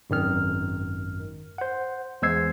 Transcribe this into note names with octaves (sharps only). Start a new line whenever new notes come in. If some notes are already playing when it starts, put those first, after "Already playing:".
G#1 F#2 D#3 F6
C5 F#5
E2 G#3 C5 E6 G#6 C7